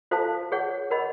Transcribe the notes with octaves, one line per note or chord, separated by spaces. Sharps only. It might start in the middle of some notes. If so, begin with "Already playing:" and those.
F4 A4 C5 F5 A5
G#4 C#5 F#5
A#4 D#5 F#5 B5